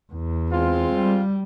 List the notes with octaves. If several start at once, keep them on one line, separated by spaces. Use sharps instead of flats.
E2
G#3 C4 F4
G3